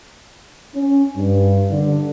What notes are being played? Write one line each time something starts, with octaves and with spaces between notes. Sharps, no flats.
C#4
G2
D3